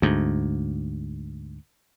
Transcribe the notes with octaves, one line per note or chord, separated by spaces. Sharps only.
D2 G#2